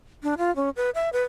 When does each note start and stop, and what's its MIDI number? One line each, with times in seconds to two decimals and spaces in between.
0.23 0.34 62
0.38 0.54 65
0.56 0.70 61
0.76 0.90 71
0.95 1.09 76
1.13 1.23 71